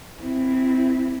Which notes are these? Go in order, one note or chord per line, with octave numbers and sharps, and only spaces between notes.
C4 E4